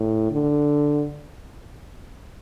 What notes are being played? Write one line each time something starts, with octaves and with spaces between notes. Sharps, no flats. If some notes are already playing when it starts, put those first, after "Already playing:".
Already playing: A2
D3